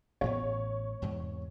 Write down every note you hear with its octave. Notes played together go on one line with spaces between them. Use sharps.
A1 A2 B3 C#5
E2 G#2 C3